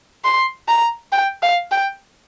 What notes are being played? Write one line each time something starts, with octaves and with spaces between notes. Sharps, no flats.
C6
A#5
G5
F5
G5